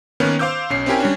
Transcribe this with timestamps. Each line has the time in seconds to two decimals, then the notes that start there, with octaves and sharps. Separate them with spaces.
0.20 D#3 A#3 B3 C#4 B4
0.39 C5 F5 D6 E6 G6
0.70 B1 C#4 C7
0.86 C4 C#4 E4 G4 A#4 G#5
1.00 G3 C#4 D4